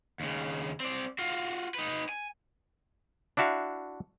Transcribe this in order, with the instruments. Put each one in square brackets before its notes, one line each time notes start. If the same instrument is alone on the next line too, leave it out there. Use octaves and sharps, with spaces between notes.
[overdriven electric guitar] D#2 C#3
C4 D5
F4 F#4
D#4 B4
G#5
[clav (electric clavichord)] D4 E4 F#4 E5 F5